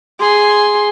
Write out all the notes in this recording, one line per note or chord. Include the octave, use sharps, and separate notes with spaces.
G#4 C6